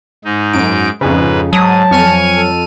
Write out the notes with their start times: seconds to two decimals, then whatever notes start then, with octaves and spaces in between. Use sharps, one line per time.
0.24 G#2 D#4
0.53 F#2 D7
1.01 F2 G#2 C#3 D#4 B4
1.53 G#2 F#3 A5 D#6
1.91 F2 G#5 C#6 F6 D#7
2.36 A4